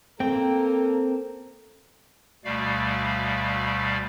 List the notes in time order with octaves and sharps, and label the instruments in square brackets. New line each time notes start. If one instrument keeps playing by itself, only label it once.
[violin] A#3 [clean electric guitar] C4 [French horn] A4 [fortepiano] G5
[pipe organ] D2 B2 G3 A3 D5 F5